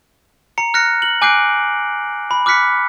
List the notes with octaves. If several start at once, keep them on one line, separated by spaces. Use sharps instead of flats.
A#5 C#7
F6 F#6 A#6 C#7
F#7
G#5 D6 F#6 G6 C7 D7
B5
D6 F6 F#6 B6 C#7